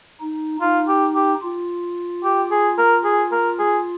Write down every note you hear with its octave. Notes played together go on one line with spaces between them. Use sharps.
D#4
D#4 F4
G4
G4
F4
G4
G#4
A#4
G#4
A#4
G#4